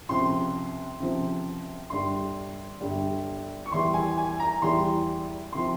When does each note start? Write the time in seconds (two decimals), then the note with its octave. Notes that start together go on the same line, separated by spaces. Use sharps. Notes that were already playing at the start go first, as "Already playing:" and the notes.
0.09 C#2 C3 F3 C6
1.00 C#2 C3 F3
1.90 G1 G2 G3 C6
2.81 G1 G2 G3
3.66 C#6
3.72 E2 E3 G3 C6
3.94 G#5
4.17 G#5
4.40 A#5
4.62 E2 E3 G3 C6
5.52 C3 F3 C6